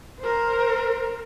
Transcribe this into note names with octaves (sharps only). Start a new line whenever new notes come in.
A#4 C5